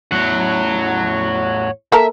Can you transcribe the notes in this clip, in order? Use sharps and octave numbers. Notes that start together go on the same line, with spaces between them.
E2 A2 C#5 F#5
A#3 A4 A#4 E5